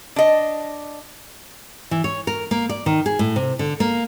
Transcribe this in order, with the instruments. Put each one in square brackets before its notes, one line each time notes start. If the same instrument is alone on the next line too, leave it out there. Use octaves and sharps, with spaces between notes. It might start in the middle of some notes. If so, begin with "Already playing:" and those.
[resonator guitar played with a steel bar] D4 D#5
[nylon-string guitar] E3
C#5
A#4
A#3
D5
D#3
G#4
A2
C3
D3
A#3